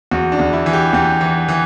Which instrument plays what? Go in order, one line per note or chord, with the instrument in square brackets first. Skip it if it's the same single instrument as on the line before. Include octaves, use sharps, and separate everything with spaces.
[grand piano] E2 F#4
D4
E2
E4
E3
G4
E2 G4
E3
E3